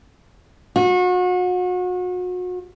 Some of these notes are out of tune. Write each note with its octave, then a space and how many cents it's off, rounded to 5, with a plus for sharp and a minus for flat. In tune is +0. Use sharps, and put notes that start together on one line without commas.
F#4 -35